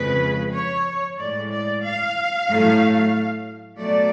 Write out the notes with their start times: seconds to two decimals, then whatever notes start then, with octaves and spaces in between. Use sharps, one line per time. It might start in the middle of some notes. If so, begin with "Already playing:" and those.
Already playing: F2 C#3 G#3 B4
0.54 C#5
1.19 A2 G#3 D5
1.51 D5
1.84 F5
2.49 A2 F#3 A3
3.78 B2 F#3 A3 D5